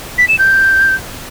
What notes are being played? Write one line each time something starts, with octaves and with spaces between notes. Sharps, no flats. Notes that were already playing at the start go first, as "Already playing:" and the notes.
B6
E7
G6